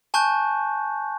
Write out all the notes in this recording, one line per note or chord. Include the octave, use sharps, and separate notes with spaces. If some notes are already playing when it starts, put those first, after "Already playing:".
G#5 A5 C#6 F#6 G6